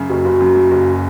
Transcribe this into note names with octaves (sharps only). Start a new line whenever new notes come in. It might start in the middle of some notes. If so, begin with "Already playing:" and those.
Already playing: F#2 C#3
F#1 F#4
F#1
F#2
C#3
F#1